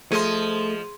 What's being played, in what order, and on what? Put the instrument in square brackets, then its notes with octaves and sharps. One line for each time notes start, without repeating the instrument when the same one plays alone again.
[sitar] F3 D#5 [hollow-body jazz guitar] A3 [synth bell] G#4 C6